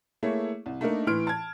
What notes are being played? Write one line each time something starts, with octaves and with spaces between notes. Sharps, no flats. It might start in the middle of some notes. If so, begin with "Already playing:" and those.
A3 A#3 E4 G#4 C#5
C2
A3 A#3 D4 D#4 A#4
A2 E3 C6 F6 D7
A5 G#6